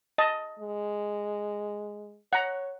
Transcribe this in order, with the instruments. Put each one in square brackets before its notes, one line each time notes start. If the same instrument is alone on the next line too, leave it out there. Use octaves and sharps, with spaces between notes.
[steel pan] D#5 A5
[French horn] G#3
[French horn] C#5 [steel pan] F#5 A#5